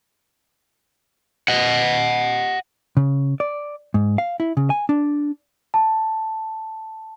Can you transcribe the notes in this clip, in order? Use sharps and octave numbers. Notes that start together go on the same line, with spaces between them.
D#5 F#5
C#3
D5
G#2
F5
E4
C#3
G#5
D4
A5